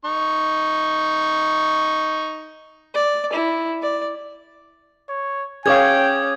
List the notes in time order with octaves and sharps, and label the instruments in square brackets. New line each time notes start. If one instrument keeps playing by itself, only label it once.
[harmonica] D#4 C#6
[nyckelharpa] D5
E4
D5
[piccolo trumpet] C#5
[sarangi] C#4 [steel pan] G#4 C#5 F5 [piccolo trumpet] G5 [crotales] D6 D#6 G#6